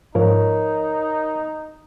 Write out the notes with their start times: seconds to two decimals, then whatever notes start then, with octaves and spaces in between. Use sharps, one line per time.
0.15 G#2 F3 D#4 A#4 C#5